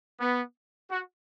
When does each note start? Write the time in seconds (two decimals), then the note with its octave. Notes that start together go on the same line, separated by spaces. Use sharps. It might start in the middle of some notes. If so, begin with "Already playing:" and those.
0.20 B3
0.91 F#4